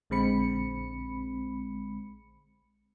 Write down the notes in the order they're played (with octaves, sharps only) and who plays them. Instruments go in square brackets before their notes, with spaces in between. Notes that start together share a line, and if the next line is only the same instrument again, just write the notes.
[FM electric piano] A#1 D3 G#3 C4 B5 C#7